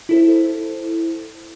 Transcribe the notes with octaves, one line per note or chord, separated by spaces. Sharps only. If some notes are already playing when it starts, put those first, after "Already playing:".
E4 A4 C5